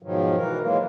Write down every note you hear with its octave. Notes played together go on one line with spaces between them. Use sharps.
G#2 B2 D#3 F3 F#3
E3 A#4
E3 F#3 G#3 A#3